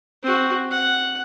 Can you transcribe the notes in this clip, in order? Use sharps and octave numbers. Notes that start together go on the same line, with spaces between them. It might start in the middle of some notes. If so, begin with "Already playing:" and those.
C4 F#4
F#5